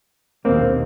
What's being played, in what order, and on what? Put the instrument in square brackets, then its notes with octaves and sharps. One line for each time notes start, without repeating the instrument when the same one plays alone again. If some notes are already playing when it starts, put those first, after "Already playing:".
[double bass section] A#1 D#2 B2 [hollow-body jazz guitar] A#3 C4